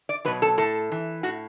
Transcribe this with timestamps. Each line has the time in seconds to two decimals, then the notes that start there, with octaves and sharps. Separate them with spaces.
0.09 D5
0.25 B2 F#3 B4
0.42 A4
0.58 A2 A4
0.92 E3
1.23 A2 F#4